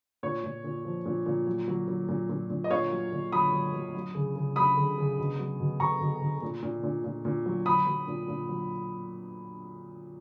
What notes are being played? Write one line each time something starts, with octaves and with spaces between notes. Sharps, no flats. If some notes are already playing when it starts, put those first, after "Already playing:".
A#2 C#5
A#2
A#2
F3
A#2
A#2
F#3
F#3
F#3
A#2
A#2
A#2
D#5
A#2 C#5 F5
F#3
A#2
F#3 B5 D#6
F#3
F#3
F#3
C#3
C#3
F#3 B5 D#6
C#3
C#3
B2
F#3
B2
B2 A#5 C#6
B2
B2
A#2
A#2
A#2
A#2
A#2
F#3
F#3 B5 D#6
F#3
A#2
A#2
F#3